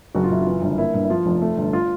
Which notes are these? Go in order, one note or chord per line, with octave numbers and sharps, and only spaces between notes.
F#1 F#4
F4
F#1 E4
F4
E3
G1
A#3 E4
G2
E4
F3 F4
F1
A3
G1
F4